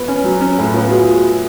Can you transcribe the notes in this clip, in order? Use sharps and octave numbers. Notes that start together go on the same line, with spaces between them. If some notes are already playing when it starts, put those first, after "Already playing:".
Already playing: B3 F4
C#4
F#3
C#4
A2
B3 F4
F#4 G#4